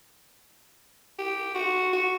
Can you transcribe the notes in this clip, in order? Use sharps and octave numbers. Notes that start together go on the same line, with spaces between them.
G4
F#4
F#4